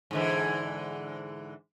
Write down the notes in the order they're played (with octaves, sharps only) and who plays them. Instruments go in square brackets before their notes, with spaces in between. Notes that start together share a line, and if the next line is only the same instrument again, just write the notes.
[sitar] G#2 D3 E3